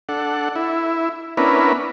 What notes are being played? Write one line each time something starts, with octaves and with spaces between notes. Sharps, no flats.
D4 A4 F#5
E4
B3 C#4 D4 E4 A#4 B4